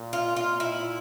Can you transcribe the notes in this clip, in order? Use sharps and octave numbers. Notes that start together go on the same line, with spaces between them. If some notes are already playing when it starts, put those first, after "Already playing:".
Already playing: A#2
F4
A#2 F4
E4